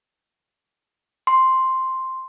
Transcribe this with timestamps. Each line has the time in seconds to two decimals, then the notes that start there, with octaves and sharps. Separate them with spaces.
1.27 C6